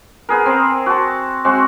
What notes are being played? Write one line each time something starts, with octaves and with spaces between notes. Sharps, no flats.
B3 G#4 A#4
C4
F#4 A5
G#3 C4 F#4